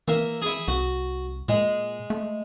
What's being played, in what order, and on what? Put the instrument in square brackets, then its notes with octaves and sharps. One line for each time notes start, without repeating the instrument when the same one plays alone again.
[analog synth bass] E3 [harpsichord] A#3 E5
[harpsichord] E4 G#4
[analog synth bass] C2 [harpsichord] F#4
[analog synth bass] A#2 [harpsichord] G#3
[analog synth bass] A3